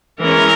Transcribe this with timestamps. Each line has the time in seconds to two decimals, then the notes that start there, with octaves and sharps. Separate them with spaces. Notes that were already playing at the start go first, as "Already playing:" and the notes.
0.21 E3 G#3 C#4 A#4